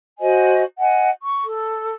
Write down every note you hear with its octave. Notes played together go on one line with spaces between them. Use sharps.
F#4 C5 D#5 G#5
D#5 F#5 G#5
C#6
A4